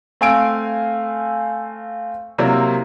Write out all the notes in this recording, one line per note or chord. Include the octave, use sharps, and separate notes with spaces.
A3 C4 F5 G#5 E6 D7
C3 F#3 A#3 C4 E4